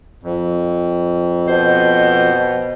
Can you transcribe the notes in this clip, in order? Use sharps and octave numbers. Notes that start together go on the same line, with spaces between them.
F2
B2 C5